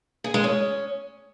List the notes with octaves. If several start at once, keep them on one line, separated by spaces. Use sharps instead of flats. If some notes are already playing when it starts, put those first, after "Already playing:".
G#4
G#3
C#4